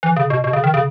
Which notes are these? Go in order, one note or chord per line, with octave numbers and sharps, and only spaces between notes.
E3
C#3
B2
B2
C#3
D#3
C#3